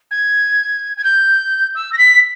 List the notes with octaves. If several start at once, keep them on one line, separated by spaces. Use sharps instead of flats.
G#6
G#6
G6
E6
A#6
B6